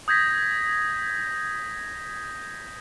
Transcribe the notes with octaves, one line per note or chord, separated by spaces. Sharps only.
D#6 G6 G#6 A#6 B6